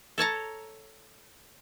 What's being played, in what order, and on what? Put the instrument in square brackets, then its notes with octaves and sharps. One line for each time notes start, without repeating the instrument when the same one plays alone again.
[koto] A4 C#5 A5 A#5